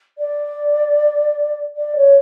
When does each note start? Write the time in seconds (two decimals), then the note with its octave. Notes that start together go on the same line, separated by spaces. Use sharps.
0.18 D5
1.76 D5
1.96 C#5